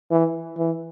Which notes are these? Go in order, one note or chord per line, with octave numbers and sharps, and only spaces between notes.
E3
E3